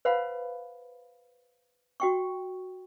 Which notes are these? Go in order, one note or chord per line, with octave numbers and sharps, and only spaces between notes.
B4 C5 F5 F#5 B5
F#4 G5 C#6